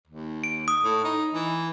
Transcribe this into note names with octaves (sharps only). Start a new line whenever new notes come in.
D#2
D7
D#6
A2
D#4
E3